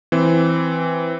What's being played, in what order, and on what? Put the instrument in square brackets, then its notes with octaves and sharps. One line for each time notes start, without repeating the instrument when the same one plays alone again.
[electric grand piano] E3 C4